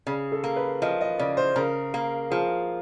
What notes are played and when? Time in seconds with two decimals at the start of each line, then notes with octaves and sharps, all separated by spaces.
0.07 C#3 G#4
0.32 A4
0.44 A#3
0.56 B4
0.82 F3 D#5
1.01 D#5
1.19 C#3 D5
1.37 C5
1.56 C#3 A#4
1.94 A#3
2.30 F3 G#4